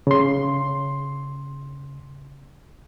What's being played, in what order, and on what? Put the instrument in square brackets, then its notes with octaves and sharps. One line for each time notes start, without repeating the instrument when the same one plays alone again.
[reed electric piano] C#3 C6